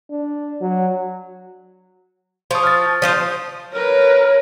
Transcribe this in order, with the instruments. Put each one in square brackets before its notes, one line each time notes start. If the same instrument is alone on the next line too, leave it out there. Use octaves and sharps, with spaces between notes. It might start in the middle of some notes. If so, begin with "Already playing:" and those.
[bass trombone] D4
F#3
[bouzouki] F3 [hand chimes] C6 C#6 D#6
[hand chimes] F6 A6
[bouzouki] F3 F4 C5
[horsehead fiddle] A#4 B4 [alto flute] C#5